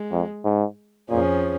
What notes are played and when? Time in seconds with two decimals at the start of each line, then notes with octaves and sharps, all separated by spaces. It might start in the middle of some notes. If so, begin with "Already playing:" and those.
Already playing: G#3
0.12 F2
0.45 G#2
1.10 F2 A#2 F3 C#4 G#4